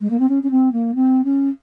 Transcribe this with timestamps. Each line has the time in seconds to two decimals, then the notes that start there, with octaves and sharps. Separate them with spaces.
0.01 G#3
0.10 A#3
0.19 C4
0.29 C#4
0.43 C#4
0.51 C4
0.72 A#3
0.95 C4
1.24 C#4